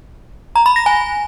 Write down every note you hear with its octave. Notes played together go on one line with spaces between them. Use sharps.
A#5
B5
A#6
G#5